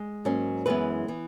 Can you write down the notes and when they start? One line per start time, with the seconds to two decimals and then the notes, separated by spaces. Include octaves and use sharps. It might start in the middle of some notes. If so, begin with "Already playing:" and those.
Already playing: G#3
0.25 G#2 F#3 A#3 C#4
0.66 F#2 E3 G#3 B3 B4
1.08 E3 B3